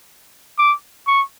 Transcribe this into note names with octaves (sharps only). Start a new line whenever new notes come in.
D6
C#6